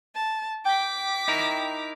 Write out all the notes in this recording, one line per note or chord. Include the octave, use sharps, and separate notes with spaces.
A5
G5 D6 B6
D#4 E4 A#4